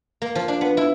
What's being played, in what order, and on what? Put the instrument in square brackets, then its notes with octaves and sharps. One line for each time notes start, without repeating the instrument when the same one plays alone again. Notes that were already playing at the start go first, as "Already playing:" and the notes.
[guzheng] A#3
F3
D4
B3
E4